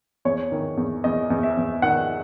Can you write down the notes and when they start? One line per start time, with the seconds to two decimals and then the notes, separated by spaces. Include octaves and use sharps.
0.25 E2 C#5
0.52 D#3
0.77 E2
1.04 E2 D#5
1.30 E2
1.43 E5
1.57 E2
1.82 D#3 F#5